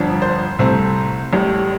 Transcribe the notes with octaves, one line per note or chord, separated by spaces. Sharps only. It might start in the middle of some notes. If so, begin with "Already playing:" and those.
Already playing: G1 F2 F3 D4
C5
C2 C3 A3 C4
A1 A2 G3